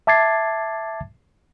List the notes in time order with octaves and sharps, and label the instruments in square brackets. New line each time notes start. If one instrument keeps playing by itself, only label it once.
[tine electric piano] E5 A5 D6 G#6 A6 C7